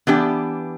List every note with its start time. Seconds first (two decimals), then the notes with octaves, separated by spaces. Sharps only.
0.07 E3 B3 D4 G4